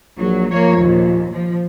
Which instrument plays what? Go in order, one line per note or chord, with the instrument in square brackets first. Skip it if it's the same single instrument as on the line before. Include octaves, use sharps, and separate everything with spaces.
[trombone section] A#1 [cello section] F#3
[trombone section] F3 [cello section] A#3 C#5
[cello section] D#2 A#2
F3